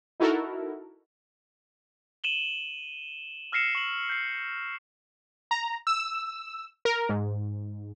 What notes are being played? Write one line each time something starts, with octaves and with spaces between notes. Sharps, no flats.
D#4 E4 F#4 A4 A#4
D#7 E7 F#7 G7
E6 F6 A#6 C7 C#7 E7
C#6 F#7
G6 C7
A#5
E6
A#4
G#2